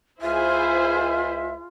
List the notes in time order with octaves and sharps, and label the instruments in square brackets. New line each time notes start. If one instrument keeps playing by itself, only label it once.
[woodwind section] C#2 E5 [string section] E4 G#4 C5 [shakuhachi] F4